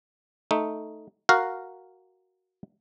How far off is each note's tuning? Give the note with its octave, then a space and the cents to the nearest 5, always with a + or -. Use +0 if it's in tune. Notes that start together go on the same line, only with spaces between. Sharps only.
A3 +0 D#4 +0
F#4 +0 A#4 -5 F5 +0